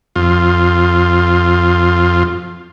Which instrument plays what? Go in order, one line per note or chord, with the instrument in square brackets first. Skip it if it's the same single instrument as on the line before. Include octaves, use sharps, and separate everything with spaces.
[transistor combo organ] F2 F4